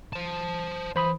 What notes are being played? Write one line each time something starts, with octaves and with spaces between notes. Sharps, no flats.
C5 A5
E3 C5 B5 D#6